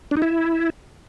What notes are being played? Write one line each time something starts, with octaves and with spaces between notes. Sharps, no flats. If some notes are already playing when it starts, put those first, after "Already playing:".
D4
D#4
E4